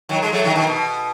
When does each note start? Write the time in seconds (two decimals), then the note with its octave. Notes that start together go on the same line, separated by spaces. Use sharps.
0.09 D#3 F#3
0.22 G#3
0.32 F#3 A3
0.44 D#3 F#3
0.55 B2 D#3
0.67 B2